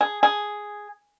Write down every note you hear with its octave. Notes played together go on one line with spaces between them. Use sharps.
G#4
G#4